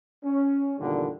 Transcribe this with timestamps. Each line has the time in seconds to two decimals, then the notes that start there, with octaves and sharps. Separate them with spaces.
0.25 C#4
0.80 E2 G2 A#2 D3 D#3 G3